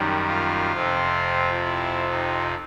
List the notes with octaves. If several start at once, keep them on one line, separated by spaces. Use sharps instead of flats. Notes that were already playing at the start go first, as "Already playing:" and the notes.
Already playing: F#2 D#3 G3
F4
F2 C3 F3
E4
D#4